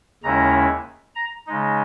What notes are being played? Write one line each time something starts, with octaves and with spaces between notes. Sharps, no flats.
D#2 C#3 G#3 C#4 E4 A#5
A#5
C#3 G#3 D#4